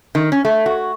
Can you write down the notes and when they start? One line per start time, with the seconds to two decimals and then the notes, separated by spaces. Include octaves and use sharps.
0.15 D#3
0.32 C#4
0.45 A3
0.66 F#4